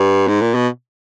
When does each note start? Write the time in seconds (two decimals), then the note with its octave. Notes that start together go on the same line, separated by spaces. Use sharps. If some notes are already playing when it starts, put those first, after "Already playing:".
Already playing: G2
0.28 G#2
0.41 A#2
0.54 B2